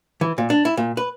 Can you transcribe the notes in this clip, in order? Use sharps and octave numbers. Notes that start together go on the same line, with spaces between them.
E3
A#2
D4
E4
A#2
B4